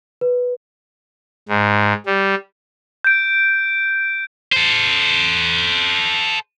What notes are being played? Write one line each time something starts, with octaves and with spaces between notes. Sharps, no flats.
B4
G#2
G3
G6 D7
A4 C5